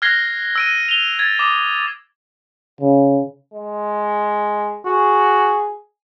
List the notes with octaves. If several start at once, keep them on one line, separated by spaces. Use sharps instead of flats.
F6 F#6 G#6 A#6 C7 G7
E6 D7 D#7
F7 G7
G#6 A6
D6 D#6
C#3
G#3
F#4 G#4